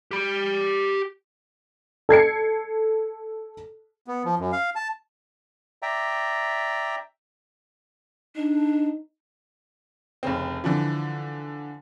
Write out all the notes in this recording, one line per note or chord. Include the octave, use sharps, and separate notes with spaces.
G4 B5
A4 G#6 C7 C#7
B3
F3
F#2
F5
A5
D5 E5 G5 A#5
D4 D#4
F1 C#3 C4
D3 E3 F3